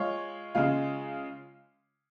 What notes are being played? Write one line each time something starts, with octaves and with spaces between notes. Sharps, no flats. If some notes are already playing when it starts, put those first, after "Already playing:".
Already playing: G#3 F4 C#5
C#3 G#3 F4